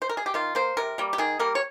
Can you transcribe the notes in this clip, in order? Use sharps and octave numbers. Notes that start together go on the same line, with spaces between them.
C5
A#4
G#4
G4
D#3 F4
A#3 C5
C3 A#4
G3 A#3
G4
D#3 G#4
G3 A#3 A#4
C#5